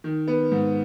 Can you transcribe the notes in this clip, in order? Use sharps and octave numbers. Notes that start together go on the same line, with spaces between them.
D#3
B3
G#2